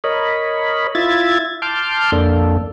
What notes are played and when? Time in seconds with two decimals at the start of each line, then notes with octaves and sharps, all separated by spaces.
0.04 A#4 C#5 D#5 B5
0.95 E4 F4 E5 G#6 A6
1.62 A5 C6 D6 F6 G6
2.12 F2 A#3 D4 A4